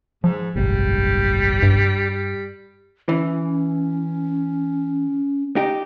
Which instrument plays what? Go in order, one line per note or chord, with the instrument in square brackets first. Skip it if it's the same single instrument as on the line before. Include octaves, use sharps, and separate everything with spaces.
[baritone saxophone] G#2 [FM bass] F3
[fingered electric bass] F#1 B1 G#2 [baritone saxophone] G3
[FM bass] G2
[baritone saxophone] G3
[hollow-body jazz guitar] E3 [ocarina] C#4
[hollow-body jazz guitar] D#4 G4